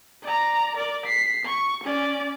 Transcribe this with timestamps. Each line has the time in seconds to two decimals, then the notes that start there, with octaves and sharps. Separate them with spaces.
0.23 D5 A#5
0.76 A#4 D5
1.05 B6 C7
1.45 C#6
1.84 C#4 D5